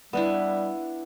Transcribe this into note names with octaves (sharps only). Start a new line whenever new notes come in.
G3 B3 D4 E4